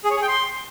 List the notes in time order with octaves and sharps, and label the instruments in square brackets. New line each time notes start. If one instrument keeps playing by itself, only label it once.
[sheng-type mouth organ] G#4
C#5
G#4
G5
C6